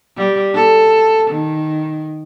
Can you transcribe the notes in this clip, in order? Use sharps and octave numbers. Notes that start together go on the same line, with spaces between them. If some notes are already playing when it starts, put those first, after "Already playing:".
G3
A4
D#3